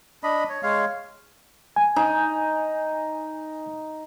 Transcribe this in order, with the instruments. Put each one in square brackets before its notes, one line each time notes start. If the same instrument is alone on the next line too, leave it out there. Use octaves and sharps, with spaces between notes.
[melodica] D4 D#5 B5
C#5
G#3 C#5 F5
[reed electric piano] G#5
[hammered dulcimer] D#4